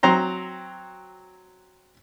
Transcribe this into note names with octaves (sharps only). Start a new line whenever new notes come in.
F#3 C4 A#5 C6